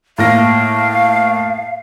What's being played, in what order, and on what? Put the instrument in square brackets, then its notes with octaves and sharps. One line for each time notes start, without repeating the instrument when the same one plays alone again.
[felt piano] A2 A#3 A#6 [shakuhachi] F5